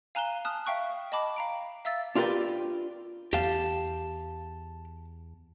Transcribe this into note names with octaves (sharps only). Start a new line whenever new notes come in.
F5 G#5 A#5 F#6 E7 G7
A5 D#6 F6 F#6
E5 F5 G5 C#6 F#6
D#5 G5 A5 B5 D6
F5 A#5 D7
E5 F5 E6 A6
D4 F4 G4 A#4 B4 D5
E2 G4 F5 A5